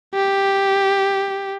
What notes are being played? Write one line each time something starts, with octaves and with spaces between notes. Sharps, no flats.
G4